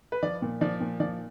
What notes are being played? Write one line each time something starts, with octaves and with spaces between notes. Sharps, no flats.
B4
F3 D5
A#2
F3 D5
A#2
F3 D5